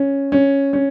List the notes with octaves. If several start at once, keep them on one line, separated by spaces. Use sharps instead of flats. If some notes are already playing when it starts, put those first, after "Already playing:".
Already playing: C#4
C#4
C#4